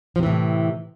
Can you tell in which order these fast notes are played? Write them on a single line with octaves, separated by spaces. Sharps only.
F3 C3 E3 A2